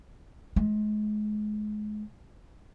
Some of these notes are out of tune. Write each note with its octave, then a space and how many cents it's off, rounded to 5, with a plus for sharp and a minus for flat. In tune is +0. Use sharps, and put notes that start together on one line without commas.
G#3 +30